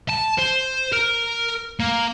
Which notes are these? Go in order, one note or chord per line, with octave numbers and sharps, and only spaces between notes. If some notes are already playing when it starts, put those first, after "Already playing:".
A5
C5
A#4
A#3